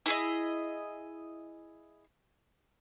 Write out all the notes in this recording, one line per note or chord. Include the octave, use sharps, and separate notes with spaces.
E4 G#4 D#5